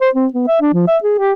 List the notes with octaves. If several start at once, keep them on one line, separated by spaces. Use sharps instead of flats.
C5
C4
B3
E5
D4
F3
E5
G#4
G4